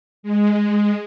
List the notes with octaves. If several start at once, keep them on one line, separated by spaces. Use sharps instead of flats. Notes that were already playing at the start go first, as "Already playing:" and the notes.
G#3